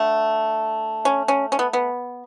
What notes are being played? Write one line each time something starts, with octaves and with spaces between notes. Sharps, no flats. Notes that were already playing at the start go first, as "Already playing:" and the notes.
Already playing: D3 A3
C#4
C#4
C#4
B3
B3